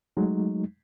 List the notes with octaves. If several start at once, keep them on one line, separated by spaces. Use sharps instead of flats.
F#3 G#3 A3 D#4